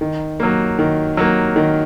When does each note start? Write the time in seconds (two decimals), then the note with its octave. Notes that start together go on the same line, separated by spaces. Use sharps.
0.01 D#3
0.40 F#3 A#3
0.79 D#3
1.17 F#3 A#3
1.56 D#3